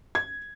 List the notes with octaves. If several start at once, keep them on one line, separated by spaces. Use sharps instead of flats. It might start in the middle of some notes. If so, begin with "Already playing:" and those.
G#6